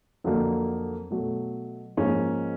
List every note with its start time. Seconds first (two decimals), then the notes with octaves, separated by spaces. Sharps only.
0.24 F2 D3 F#3 A#3
1.11 B2 F#3 A3
1.97 G#2 F3 A#3 C#4